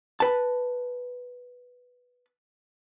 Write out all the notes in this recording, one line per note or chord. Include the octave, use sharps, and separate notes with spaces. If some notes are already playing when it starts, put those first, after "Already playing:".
B4 A5